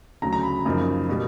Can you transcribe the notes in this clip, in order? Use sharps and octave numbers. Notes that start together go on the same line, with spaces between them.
D2 C#3 F#3 A#5
A#5
B5
F#2 C#3 F3 A#3 D#4
B2 G3 A#3